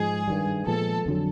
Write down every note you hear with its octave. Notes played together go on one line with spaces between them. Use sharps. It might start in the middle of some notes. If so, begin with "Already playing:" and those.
Already playing: G#2 F3 G#3 G#4
G2 D#3 G3
A#2 F3 G#3 B3 A4
F2 D3 F#3